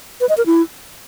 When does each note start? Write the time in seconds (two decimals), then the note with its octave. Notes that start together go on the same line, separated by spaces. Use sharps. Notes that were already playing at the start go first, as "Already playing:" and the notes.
0.21 B4
0.29 D#5
0.38 A#4
0.46 E4